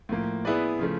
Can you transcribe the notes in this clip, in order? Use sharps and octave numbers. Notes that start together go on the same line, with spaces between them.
A2 F3 A#3
B3 E4 G#4 B4 D5
C#3 F3 A3